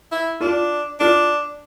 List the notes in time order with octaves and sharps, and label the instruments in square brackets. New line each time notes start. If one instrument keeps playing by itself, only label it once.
[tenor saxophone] E4
[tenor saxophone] D4 [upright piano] F4
[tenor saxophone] D4 [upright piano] F4